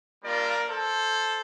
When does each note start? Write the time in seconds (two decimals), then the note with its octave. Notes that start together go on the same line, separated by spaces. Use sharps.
0.24 G3 A#3 D4 F4 A#4 D5
0.68 A4 C5